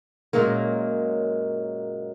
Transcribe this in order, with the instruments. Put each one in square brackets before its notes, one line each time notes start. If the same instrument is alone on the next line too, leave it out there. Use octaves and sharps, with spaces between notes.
[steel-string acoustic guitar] F#2 A#2 F#3 G#3 A#3